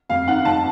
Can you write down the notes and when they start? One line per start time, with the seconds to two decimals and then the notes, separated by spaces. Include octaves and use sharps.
0.09 F2 F5
0.28 D#3 F#5
0.45 F2 A5